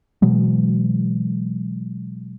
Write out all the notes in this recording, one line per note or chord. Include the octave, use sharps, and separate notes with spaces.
B2 E3 F#3 G#3